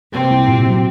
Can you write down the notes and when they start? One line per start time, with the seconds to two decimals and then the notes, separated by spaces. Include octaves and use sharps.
0.12 C3 A#3 C4
0.30 C2
0.48 A#2
0.66 F#3